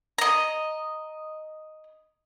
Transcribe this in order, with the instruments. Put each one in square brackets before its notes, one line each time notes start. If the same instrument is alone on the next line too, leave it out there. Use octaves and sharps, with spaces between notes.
[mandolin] D#5 A#5